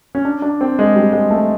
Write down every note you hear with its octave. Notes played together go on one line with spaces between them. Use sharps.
C#4
D4
D4
C4
G#3
G3
G#3
A3